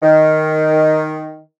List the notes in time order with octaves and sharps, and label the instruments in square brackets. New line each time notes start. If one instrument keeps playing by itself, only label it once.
[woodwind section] D#3